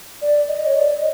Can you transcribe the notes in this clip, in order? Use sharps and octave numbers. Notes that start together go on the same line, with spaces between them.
D5
D#5
C#5
D5
D#5